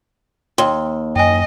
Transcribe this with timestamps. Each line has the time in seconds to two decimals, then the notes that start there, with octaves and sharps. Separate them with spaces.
0.58 D#2 G5 C6 G7
1.16 F#2 D#5 G5 G#5